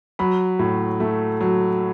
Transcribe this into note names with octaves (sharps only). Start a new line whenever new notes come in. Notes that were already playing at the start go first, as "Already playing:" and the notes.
F#3 B5
A2
A3
F#3